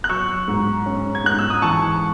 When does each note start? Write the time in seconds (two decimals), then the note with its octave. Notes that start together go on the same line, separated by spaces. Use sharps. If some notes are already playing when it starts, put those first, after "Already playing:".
0.04 F#6
0.09 F#3 C#6 E6
0.48 G#2
0.86 C#4
1.15 G#6
1.24 G#2 F#6
1.39 E6
1.50 D#6
1.62 E3 A5 C#6